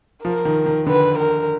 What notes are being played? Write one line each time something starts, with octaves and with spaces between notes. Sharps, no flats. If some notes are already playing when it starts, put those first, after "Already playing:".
F3 A#4
D#3
D#3
D3 B4
A#4